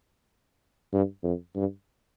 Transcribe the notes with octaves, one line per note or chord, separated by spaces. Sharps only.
G2
F2
G2